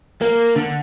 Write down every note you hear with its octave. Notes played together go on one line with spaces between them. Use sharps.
A#3
D3